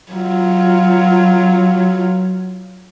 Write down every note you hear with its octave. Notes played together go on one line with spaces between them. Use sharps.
F#3 F4